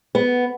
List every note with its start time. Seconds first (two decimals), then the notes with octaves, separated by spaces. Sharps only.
0.15 B3